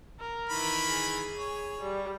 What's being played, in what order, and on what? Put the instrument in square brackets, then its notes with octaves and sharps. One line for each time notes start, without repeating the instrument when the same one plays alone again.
[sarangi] A#4
[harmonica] D#3 E3 B5
[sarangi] G#4
[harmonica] C#5
[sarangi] G3